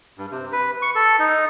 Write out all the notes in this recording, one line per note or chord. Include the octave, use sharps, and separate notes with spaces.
G2
C3
B4
C#6
A4
D#4